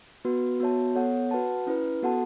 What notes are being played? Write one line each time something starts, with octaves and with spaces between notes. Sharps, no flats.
B3 F#4 B4
B3 F#4 C#5 E5 A5
B3 A4 C#5 F#5
F#4 B4 F#5 A5
C#4 E4 B4
B3 F#4 A4 F#5 A5